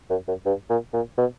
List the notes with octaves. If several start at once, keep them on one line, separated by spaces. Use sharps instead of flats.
F#2
F#2
G2
A#2
A#2
B2